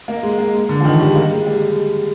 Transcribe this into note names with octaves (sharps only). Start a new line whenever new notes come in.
A#3
G#3
A#3
G#3
D3
F3
D#3
G3
G#3
A#3
G#3
G3